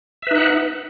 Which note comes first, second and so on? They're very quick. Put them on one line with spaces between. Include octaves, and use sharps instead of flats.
E5 B4 D#4 F#5